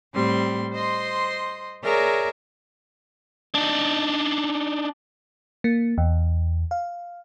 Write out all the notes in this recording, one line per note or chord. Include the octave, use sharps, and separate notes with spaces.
A2 G3 C4 C6
C5 D#5 C6
G#4 A#4 C#5 D5 E5 A#5
D4 D#4
A#3
E2
F5